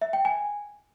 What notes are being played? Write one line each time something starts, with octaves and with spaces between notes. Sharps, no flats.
E5
G5
G#5